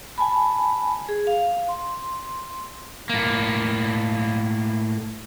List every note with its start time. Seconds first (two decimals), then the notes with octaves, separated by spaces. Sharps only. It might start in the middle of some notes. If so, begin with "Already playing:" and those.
0.18 G#5 A5 B5
1.09 G#4
1.27 F5
1.69 C6
3.09 A2 A#3